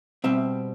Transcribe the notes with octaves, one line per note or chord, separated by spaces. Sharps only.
B2 G3 C4 E5